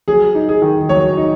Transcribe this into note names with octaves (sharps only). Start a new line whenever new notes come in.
F#3 G#4
D#4
G#4
D#3
F#3 C#5
D#4